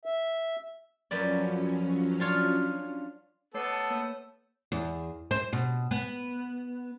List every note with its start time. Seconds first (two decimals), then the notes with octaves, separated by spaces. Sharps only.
0.05 E5
1.11 F#2 F3 F#3 C#4 B4 D5
2.20 D4 F4 C#5
3.54 A3 B3 A4 C#5 C7
3.73 A5
3.91 A#3 C#5 E6
4.72 E2
5.31 C5
5.53 B2
5.91 B3